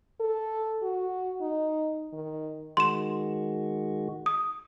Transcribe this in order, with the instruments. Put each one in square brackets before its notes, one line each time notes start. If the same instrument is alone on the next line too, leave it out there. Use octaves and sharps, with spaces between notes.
[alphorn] A4
F#4
D#4
D#3
[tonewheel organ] D#3 G#3 F#4 [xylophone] C6 E7
[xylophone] D#6